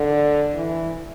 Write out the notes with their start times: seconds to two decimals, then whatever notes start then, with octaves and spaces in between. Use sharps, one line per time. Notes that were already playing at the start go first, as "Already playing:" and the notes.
Already playing: D3
0.55 E3